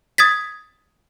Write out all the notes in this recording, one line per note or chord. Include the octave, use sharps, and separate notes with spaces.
D#6 G#6 A6 B6